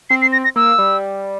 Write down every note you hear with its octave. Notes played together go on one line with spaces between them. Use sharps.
C4 C7
C7
A#6
A#6
A#3 E6
G3